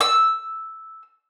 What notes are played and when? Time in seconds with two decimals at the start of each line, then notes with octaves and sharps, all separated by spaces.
0.01 E6